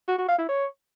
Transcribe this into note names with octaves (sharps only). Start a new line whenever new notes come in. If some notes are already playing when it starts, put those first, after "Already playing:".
F#4
F#4
F5
E4
C#5